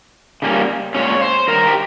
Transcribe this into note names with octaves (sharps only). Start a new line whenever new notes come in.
C#3 G3 A#3 C#4
A#2 G#3 C#4 C#5
C5
G2 D#3 A#4
G4